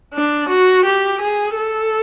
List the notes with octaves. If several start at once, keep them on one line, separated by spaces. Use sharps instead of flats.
D4
F#4
G4
G#4
A4